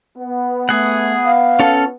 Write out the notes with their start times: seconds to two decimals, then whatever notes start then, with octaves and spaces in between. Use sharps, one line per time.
0.17 B3
0.69 A3 G#4 F#5
1.25 F5
1.59 C#4 F4 A4